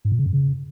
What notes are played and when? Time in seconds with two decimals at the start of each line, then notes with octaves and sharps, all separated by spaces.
0.05 G#2
0.12 A#2
0.19 C#3
0.26 F#2
0.33 C#3